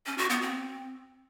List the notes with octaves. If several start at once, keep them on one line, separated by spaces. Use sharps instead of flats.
C#4
F#4
B3
C4